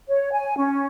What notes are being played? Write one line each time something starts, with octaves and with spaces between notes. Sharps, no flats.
C#5
G#5
C#4